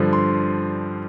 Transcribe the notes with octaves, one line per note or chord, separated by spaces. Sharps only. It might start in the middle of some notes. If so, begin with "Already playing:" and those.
Already playing: G2 D3 F3
C6